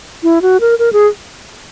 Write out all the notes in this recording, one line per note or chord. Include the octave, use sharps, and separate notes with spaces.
E4
F#4
A#4
A#4
G#4